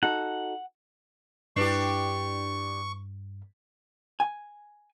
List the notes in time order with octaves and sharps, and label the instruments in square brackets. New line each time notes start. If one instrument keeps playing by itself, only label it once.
[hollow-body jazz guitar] D#4 F#4 A4 [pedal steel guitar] F#5
[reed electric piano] G2 [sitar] D4 G4 [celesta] E4 B4 C7 [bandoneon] C#6
[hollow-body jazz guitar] G#5